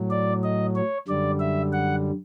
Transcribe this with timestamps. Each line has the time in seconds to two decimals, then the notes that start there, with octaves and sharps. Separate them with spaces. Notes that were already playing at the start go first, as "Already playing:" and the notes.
Already playing: A2 F#3
0.10 D5
0.44 D#5
0.75 C#5
1.08 F#2 D3 G3 D5
1.40 E5
1.73 F#5